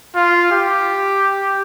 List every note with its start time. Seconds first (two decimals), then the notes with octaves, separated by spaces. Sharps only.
0.16 F4
0.51 G4